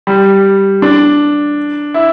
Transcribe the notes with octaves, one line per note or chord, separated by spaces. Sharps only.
G3
D4
E4